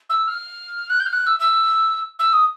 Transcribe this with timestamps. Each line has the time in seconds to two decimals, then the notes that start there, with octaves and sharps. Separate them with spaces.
0.10 E6
0.28 F6
0.90 F#6
1.00 G6
1.06 F6
1.13 F#6
1.27 E6
1.40 E6
2.19 E6
2.33 D#6